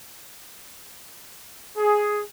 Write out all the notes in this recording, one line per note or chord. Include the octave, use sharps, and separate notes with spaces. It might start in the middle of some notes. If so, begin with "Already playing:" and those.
G#4